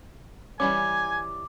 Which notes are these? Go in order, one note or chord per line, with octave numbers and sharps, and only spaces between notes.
E3 G3 C#4 G#5 D6